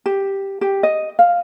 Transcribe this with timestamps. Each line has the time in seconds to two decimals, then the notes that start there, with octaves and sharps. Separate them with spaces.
0.06 G4
0.61 G4
0.83 D#5
1.19 F5